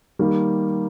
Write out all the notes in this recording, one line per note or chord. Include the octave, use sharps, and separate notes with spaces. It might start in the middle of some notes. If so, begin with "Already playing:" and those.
D#3 G3 A#3